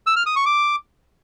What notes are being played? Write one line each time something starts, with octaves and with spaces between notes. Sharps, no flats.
E6
F6
D#6
C#6
D6